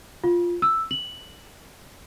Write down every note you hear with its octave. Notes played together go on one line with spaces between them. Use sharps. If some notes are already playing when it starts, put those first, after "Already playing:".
F4
E6
F#7